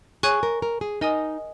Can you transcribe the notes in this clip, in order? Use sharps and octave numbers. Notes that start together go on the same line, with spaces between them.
G#4 C#5 G#5 C#6 F#6
A#4
A#4
G#4
D#4 A#4 D#5 G#5 D#6